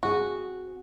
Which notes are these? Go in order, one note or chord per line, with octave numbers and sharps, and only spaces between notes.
C4 F#4 G#4